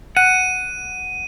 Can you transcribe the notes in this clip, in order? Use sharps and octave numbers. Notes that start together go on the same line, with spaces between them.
F#5 D#7